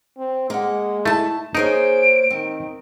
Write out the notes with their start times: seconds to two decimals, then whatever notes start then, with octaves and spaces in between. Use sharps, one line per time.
0.18 C4
0.50 G#3 A#3 F#5
1.05 A3 E4 A5
1.55 A#3 D#4 G#4 C5 C#5 D7
2.30 D#3 C4